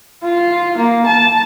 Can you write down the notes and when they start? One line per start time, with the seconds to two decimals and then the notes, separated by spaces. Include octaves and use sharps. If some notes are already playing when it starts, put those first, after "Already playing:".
0.24 F4
0.77 A#3
1.06 A5